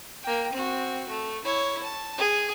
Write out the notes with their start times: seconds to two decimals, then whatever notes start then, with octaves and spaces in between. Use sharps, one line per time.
0.23 A#3 G5
0.52 C4 F#4
1.08 A3
1.45 E4 C#5
1.83 A5
2.18 G#4